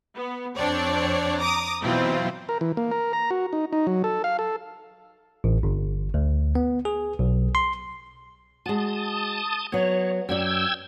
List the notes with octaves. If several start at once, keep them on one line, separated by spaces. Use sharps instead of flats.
B3
F2 C4 D4 C#5 D5
A#5 D6 D#6
B2 E3 F#3 C4 E4 F4
A#4
E3
A#3
A#4
A#5
F#4
D#4
D#4
F#3
A4
F5
A4
A1
G1
D2
B3
G#4
B1
C6
G#3 F#4 A5 D#6
F#3 B3 C#5
F#2 F#4 D5 G5 E6 G#6